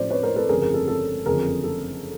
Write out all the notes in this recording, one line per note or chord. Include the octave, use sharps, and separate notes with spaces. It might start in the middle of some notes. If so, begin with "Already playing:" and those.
Already playing: A2 F3 A3 C#4 C5 D5
B4 C#5
A#4 C5
A4 B4
G1 F2 C#3 G#4 A#4
G#4 A#4
A4
A4
F#1 F2 D3 G#4 A#4
A4